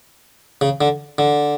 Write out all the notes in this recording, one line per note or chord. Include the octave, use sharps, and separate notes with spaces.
C#3
D3
D3